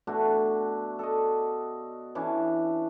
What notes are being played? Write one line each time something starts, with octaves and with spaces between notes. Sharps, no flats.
B2 A3 D4 F#4
A4 D5 D#5
E3 C#4 D4